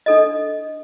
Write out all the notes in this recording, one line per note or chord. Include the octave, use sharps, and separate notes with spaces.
D4 A4 D#5